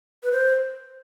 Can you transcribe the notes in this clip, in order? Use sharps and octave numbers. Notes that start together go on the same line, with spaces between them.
B4
C5